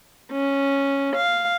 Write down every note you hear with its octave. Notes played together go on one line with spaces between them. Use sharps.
C#4
F5